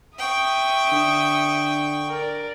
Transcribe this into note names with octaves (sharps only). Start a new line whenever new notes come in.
E5 G5 C#6 D#6
D3
A#4 D5